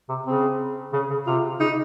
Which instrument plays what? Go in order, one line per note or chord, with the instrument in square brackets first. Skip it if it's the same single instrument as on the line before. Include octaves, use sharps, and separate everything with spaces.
[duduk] C3
[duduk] C#3 [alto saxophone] C4
[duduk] C#3 [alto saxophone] C#4
[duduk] C#3
[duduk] C3 [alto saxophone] F4
[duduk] C#3 [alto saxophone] D#4